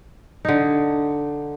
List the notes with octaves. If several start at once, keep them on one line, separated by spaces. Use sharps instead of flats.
D3 D#4